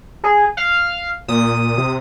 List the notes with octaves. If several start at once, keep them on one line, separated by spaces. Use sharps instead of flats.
G#4
F5
A#2 D#6
C3